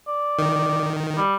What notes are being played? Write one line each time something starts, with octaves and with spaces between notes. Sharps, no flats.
D5
D#3
G3